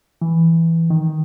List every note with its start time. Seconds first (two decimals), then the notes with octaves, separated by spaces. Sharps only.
0.22 E3
0.90 D#3